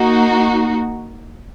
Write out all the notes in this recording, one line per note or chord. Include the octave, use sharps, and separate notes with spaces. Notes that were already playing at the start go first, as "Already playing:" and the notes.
Already playing: A#3 D#4 F#4